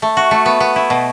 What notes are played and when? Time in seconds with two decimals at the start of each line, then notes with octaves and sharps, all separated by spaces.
0.02 A3
0.17 F#4
0.31 A3
0.46 B3
0.60 B3
0.76 E4
0.90 B2